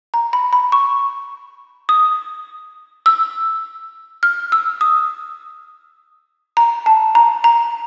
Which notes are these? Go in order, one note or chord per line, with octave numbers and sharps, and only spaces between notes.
A#5
B5
B5
C#6
D#6
E6
F6
E6
D#6
A#5
A5
A#5
A#5